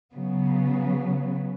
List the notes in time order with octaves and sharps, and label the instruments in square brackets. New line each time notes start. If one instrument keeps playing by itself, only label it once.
[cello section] C#3 F#3 B3